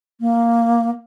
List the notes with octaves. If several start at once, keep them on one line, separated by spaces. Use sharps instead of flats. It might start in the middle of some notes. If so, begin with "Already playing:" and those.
A#3